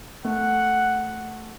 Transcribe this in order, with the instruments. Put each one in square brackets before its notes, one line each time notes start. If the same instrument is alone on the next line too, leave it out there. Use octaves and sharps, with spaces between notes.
[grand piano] A3 [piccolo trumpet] F#5